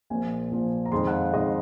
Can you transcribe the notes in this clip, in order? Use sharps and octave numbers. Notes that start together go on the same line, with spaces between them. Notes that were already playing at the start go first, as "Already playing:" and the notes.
A#1 A#2 F3 A#3 G#5
A#1 A#2 F3 A#3
A#5
F2 D#3 G#3 C6
F#5
F5
F2 D#3 G#3 D#5